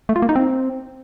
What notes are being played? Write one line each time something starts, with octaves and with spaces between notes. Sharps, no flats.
A3
F4
A#3
D#4
C4